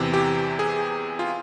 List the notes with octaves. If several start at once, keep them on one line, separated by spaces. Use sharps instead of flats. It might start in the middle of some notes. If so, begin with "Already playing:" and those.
Already playing: E2 C3 E3
G4
G#4
F4